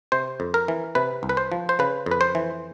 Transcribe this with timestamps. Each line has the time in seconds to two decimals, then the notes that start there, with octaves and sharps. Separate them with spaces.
0.12 C3 C5
0.40 F2
0.54 A#4
0.68 E3
0.95 C3 B4
1.23 C2
1.29 B4
1.37 C5
1.52 F3
1.69 C5
1.79 C#3 B4
2.06 F2
2.11 B4
2.21 C5
2.35 E3